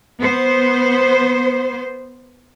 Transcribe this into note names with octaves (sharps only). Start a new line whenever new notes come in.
B3 C5